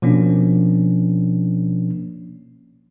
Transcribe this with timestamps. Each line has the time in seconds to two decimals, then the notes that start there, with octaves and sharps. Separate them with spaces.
0.02 B2 F3 A#3 C#4 D4